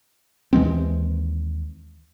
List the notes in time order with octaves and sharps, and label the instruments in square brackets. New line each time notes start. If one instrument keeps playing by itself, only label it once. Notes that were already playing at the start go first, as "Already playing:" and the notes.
[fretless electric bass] D#2 E3 G#3 C4